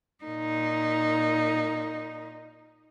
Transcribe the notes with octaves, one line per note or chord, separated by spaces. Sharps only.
A#2 D#4